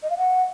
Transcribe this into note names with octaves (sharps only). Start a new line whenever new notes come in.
D#5
F5
F#5